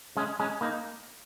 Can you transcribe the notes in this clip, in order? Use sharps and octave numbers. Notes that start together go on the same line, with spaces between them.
G#3 C#4
G#3 C#4
A#3 D#4